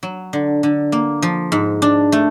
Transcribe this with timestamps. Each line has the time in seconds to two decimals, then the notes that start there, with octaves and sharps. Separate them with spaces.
0.03 F#3
0.33 D3
0.63 D3
0.92 A#3
1.22 F3
1.52 G#2
1.82 D4
2.12 A3